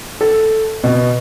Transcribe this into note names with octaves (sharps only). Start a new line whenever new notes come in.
A4
B2